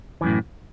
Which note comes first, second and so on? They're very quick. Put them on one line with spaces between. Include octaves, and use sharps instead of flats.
E3 F#2 A2